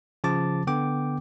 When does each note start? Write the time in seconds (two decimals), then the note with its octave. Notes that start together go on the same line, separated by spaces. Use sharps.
0.24 C#3 F3 A5 D6 A6
0.67 D3 B3 G5 D6